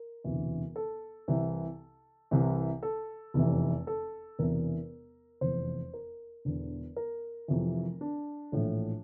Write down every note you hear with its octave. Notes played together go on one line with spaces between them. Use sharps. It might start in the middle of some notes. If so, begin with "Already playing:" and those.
Already playing: A#4
E1 D2 C3 E3
A4
C2 C3 E3
C2 C3 E3
A4
F1 E2 C3 E3
A4
E1 E2 C3 E3 A#4
F1 E2 E3 C5
A#4
E1 E2 D3
A#4
F1 F2 C3 E3
D4
A#1 A2 E3